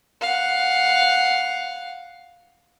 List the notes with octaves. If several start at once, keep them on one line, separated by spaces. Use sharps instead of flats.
F5 F#5